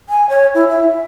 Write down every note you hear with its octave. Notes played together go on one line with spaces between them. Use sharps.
G#5
C#5
E4
E5